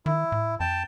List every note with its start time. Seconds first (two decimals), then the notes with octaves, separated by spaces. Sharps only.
0.06 D#3 E4
0.32 A2
0.60 F2 G5 A5